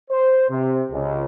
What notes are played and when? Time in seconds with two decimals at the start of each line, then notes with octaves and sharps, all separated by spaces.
0.10 C5
0.50 C3
0.92 C#2